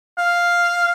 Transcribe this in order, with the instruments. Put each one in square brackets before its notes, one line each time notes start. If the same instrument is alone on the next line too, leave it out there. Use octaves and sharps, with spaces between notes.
[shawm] F5